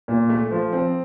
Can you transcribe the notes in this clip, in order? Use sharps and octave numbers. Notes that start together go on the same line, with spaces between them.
A#2
A3
F3
C4